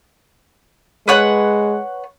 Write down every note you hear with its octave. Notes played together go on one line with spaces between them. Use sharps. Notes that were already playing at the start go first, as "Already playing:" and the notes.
G#3 B4 C#5 F#5